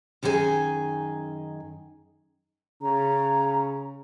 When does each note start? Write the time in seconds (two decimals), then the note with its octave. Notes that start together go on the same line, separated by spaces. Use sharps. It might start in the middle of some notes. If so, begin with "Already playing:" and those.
0.23 F#2 D#3 D#4 F#4 G#4 G#5
2.82 C#3 A#5